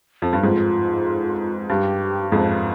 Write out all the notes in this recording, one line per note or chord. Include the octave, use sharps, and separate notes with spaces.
F2
G2
F2 G#2 F4
G2 G4
F2 G#2